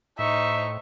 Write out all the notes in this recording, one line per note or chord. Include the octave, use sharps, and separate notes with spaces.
A2 D#4 C5 E5 C#6